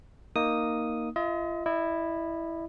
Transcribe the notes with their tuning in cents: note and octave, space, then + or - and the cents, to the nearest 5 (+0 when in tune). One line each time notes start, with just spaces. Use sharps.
A#3 +0 D#4 +0 D#6 +0
F4 -35 D#5 +35
E4 +0 D#5 -35